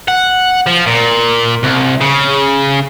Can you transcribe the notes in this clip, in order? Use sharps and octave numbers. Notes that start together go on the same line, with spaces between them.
F#5
F3
A#2
C2
C#3